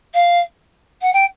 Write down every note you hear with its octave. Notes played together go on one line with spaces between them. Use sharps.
F5
F#5
G5